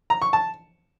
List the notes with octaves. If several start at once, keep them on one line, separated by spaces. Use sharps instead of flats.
A#5
C#6
A5